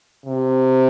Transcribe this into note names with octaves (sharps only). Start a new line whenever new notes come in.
C3